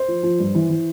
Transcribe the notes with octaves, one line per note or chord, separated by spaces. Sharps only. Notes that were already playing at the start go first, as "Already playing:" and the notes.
Already playing: C5
F3
F3
G2
E3
E3